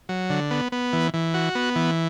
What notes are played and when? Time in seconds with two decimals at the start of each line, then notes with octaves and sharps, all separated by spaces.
0.09 F#3
0.30 D3
0.51 B3
0.72 B3
0.93 E3
1.14 E3
1.34 F#4
1.55 B3
1.76 E3